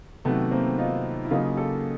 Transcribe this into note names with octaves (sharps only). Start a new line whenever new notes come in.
C3 D#3 F#3 A3 B3
A#3 C4
D#4 F4
E4
C#3 F#3 A#3 D#4 F4
G4 A4